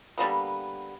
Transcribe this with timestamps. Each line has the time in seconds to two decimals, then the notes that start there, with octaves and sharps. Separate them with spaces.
0.18 D3 G3 A#3 B3